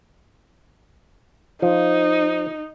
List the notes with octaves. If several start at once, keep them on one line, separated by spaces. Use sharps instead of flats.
F3 D#4